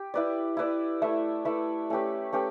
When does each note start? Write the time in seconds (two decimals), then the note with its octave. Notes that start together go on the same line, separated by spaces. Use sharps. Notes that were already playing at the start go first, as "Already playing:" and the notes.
Already playing: G4
0.14 E4 B4 D5
0.57 E4 B4 D5
1.02 A3 E4 B4 E5
1.45 A3 E4 B4 E5
1.90 A3 C#4 G4 B4
2.33 A3 C#4 G4 B4